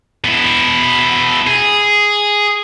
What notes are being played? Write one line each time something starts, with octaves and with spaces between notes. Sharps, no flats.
B2 E4
G#4